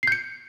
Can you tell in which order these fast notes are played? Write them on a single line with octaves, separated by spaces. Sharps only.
C7 G6 C#7